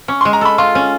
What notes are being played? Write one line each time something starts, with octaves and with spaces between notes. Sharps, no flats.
C#4 C#6
C6
G#3
A#5
A4 B5
F4 C6
C#4